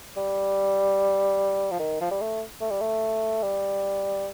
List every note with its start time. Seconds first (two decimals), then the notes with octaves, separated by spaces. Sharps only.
0.17 G3
1.72 F3
1.79 D#3
2.01 F3
2.11 G3
2.21 A3
2.61 A3
2.70 G3
2.81 A3
3.43 G3